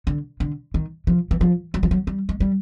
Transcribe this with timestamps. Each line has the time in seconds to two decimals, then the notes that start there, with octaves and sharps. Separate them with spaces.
0.07 D3
0.40 D3
0.74 D#3
1.07 F3
1.31 E3
1.41 F3
1.74 F#3
1.83 F3
1.91 F#3
2.07 G3
2.29 G#3
2.40 G3